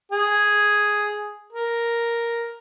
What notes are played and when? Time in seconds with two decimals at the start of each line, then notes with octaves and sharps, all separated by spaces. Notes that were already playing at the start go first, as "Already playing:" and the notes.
0.12 G#4
1.53 A#4